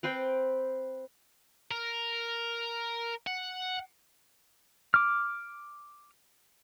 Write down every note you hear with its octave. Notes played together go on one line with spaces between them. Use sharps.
C4 B4 C5 G5
A#4
F#5
D6 F6